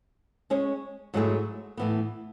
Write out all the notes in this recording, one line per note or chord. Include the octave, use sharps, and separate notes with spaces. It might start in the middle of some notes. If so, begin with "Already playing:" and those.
G#3 C#4 G#4 C#5
G#2 F#3 A3 E4 G#4
A2 E3 B3